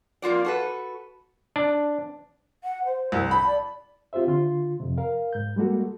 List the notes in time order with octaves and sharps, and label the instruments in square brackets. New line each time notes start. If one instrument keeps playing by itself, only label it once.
[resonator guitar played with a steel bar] F2 A#3 F4 F#4 D5
F#4 A4 B4
[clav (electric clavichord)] D4
[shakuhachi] F#5
C5
[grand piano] C2
[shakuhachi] A5 [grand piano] B5
[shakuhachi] D5
[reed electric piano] C4 F4 G4 C5 E5
D3 F4 C6
F2 C3
A#4 F5
G#2 G6
G3 G#3 A#3 F#4 A4